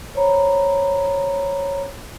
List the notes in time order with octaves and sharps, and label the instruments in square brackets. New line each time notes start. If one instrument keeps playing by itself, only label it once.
[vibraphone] C5 C#5 A#5 B5